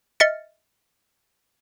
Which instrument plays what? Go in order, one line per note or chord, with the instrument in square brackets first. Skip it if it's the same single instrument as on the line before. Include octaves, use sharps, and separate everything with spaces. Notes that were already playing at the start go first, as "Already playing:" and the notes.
[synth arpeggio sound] D#5 E5 F6 A6 C#7